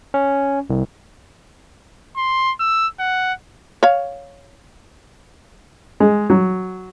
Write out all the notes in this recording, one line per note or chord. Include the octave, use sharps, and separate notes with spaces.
C#4
C2
C6
E6
F#5
C#5 F5
G#3
F#3